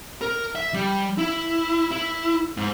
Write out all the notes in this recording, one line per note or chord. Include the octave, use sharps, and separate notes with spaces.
A#4
E5
G3
E4
E4
G#2